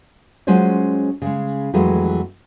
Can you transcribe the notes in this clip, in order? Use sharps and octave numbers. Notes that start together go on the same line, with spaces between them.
F#3 G#3 C#4 F4 C5 C#5
C#3 G#3
F2 E3 F#3 G#3 A3